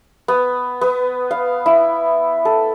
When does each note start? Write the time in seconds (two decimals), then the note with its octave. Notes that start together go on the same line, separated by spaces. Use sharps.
0.28 B3
0.81 B3
1.31 F5
1.66 E4
2.45 A4